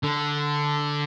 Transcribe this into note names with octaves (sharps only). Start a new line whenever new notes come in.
D3